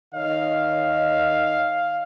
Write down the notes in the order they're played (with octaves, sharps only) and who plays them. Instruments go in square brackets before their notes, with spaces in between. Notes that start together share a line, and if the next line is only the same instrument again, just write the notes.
[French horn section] D#3 C#5 D#5 [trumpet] F5